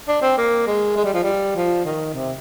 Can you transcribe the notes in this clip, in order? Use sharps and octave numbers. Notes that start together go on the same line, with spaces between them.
D4
C4
A#3
G#3
G#3
G3
F3
G3
F3
D#3
C3